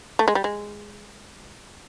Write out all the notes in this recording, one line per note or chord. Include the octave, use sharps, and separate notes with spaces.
A3
G#3
G3
G#3